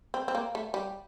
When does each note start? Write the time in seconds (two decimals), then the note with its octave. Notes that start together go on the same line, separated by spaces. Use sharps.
0.14 C4
0.28 C4
0.35 A#3
0.55 A3
0.74 G3